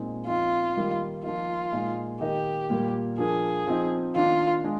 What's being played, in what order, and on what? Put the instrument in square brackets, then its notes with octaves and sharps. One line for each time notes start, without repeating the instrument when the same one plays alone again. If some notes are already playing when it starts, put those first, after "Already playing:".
Already playing: [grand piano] A#2 G#3 C4 D#4
[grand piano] F3 C4 D#4 [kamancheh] F4
[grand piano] D#3 G3 A#3 D#4
[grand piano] F3 A#3 D#4 [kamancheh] F4
[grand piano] A#2 G#3 D#4
[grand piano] D#3 A#3 D#4 [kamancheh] G4
[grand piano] A#2 G3 A#3
[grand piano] F3 A#3 D4 [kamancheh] G#4
[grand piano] F3 C4 D#4
[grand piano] D#3 A#3 D4 [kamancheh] F4
[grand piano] G#3 D4